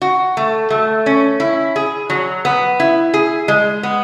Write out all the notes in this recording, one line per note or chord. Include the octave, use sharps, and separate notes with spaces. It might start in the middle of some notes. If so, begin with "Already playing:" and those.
F#4
A3
A3
C#4
E4
G#4
F#3
B3
E4
G#4
G#3
B3